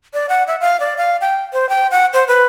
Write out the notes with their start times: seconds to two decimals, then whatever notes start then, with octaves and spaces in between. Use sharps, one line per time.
0.14 D5
0.29 F#5
0.47 E5
0.61 F5
0.80 D5
0.97 F5
1.21 G5
1.53 C5
1.69 G5
1.91 F#5
2.13 C5
2.28 B4